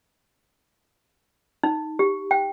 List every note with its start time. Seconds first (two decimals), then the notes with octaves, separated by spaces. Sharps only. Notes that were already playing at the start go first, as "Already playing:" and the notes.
1.63 D#4
1.99 G4
2.31 G5